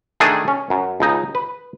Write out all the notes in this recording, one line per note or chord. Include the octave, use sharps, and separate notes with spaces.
D#3 A3 D4 G#4
C#4
F#2
C#2 D#4
B4